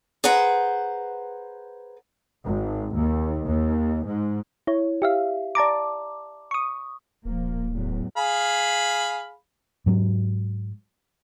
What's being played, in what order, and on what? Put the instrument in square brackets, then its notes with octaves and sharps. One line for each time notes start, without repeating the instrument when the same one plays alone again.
[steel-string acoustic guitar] G#4 B4 C5 F#5 A#5
[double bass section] G#1
D#2
D#2
G#2
[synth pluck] E4 C#5
G4 E5 F5
D5 A5 A#5 D6
C#6 D#6
[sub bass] D1 [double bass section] A#1 F3 A#3
[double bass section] E2 A2 F#3
[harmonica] G#4 F5 B5
[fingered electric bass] G#2 F#3 G#3